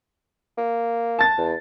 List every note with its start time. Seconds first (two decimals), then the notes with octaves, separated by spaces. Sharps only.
0.58 A#3
1.19 A5 A6
1.38 E2